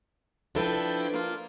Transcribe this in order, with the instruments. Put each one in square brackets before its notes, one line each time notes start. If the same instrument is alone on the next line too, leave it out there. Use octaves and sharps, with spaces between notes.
[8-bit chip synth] F3 E4 G5 [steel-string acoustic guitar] D4 A4 B4
[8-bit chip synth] A#3 F4